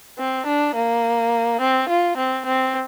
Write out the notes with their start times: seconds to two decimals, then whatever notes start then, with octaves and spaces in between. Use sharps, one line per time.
0.19 C4
0.47 D4
0.76 A#3
1.61 C4
1.90 F4
2.17 C4
2.46 C4